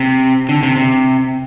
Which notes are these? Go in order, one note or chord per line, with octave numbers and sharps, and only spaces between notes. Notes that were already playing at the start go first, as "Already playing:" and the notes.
Already playing: C3
D3
C3
C3